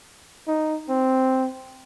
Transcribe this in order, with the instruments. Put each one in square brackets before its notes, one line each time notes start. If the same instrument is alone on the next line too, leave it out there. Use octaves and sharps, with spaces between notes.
[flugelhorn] D#4
C4